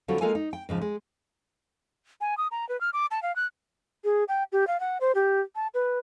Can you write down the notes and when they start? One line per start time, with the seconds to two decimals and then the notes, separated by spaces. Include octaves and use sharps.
0.08 D3 F#3 G3 C4 F4 F#4
0.21 G#3 A#3 F4 A4 G#5
0.35 D#4
0.53 G5
0.69 G#2 C#3 F3
0.81 G#3
2.21 G#5
2.38 D#6
2.51 A#5
2.69 B4
2.81 F6
2.93 D6
3.11 A5
3.23 F5
3.36 F#6
4.04 G#4
4.28 G5
4.52 G4
4.67 F5
4.80 F#5
5.01 C5
5.15 G4
5.55 A5
5.74 B4